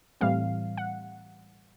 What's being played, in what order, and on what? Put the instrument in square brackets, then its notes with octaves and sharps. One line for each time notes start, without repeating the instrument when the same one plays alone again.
[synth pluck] A2 E3 G3 C4 F5
F#5